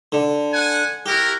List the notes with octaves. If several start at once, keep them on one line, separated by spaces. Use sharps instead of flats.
D3
F#5 G#5
E4 F#4 G4 A#4